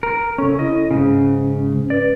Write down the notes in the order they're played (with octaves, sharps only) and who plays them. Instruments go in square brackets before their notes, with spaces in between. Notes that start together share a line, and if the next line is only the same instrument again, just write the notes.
[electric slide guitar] A#4
[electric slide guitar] C#3 C#4 [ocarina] A4
[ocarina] E4 [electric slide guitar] D#5
[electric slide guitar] G#2 C#3 [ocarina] C#4
[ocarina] B4 [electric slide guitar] D5